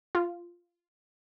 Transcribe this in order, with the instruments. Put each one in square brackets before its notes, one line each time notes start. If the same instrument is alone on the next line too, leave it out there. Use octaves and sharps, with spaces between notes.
[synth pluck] F4